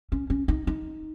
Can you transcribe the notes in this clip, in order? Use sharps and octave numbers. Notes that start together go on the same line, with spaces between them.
C#4
C#4
D#4
D#4